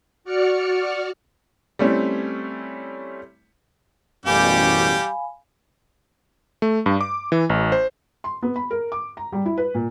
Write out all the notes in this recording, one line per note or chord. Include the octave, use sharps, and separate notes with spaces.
F#4 D5 F6 C#7
G3 A3 C4 C#4 E4
A1 F#2 B2 G3 G4 F5 G#5 B5
A3
G2
D6
E3
A1
C5
C6
B3
B5
A#4
D6
A#5
G3
E4
B4
A#2